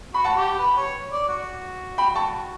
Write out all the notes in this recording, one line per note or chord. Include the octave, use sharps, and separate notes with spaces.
F#4 B5
F#5 A5
G4
B4
C#5
D5
F#4
G5 B5
A5 C#6